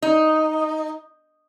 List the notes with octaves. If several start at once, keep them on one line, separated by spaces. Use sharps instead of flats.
D#4